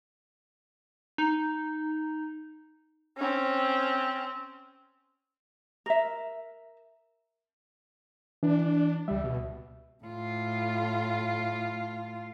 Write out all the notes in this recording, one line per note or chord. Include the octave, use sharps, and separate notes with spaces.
D#4
C4 C#4
A#4 E5
E3 D4
D4
C#2 G3 E5
B2
A2 F4